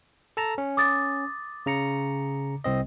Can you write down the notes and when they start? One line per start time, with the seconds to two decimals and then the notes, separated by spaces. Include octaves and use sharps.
0.37 A4 A5 A#5
0.58 C#4
0.77 D6 D#6 A6
1.66 C#3 A#5 C#7
2.64 C2 C4 D#5